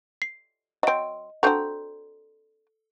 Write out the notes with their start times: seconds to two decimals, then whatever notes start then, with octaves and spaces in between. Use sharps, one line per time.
0.22 C7
0.83 F#3 C4 D#5 D7
1.43 C4 D4 F#4 A4 A#5 G6